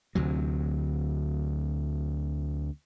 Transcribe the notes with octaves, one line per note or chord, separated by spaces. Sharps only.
D2 C3 F#3